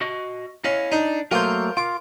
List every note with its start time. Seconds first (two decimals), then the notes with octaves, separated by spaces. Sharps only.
0.01 F#4 D#5
0.64 C#4 E4 D#5 F5
0.92 D4 D#4
1.31 F#3 A3 A#3 F4 A#4 C5
1.77 F4 D6